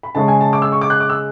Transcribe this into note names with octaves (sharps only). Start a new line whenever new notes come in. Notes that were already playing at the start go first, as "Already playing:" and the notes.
B5
C#3 G#3 C#4 A5
G#5
A5
D6
E6
C#6
D6
F#6
D6
E6